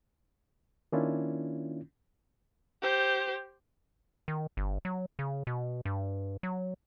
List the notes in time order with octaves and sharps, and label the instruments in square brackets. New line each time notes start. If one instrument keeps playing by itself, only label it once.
[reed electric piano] D#3 A#3 C#4 D4 E4 F4
[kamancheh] G4 C5
[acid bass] D#3
G1
F#3
C#3
B2
G2
F#3